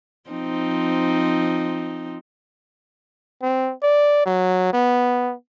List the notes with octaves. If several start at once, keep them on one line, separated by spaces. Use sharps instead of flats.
F3 C4 D#4
C4
D5
F#3
B3